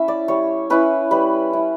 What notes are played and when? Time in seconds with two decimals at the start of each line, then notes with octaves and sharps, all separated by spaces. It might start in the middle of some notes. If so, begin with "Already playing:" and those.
Already playing: C#4 E4 E5
0.08 D5
0.28 G3 C#5
0.70 C#4 E4 B4
1.11 G3 B4
1.53 C#4 E4